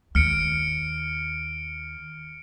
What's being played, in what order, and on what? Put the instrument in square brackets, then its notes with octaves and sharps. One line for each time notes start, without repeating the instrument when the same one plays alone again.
[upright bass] D#2 [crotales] F6 C#7 D7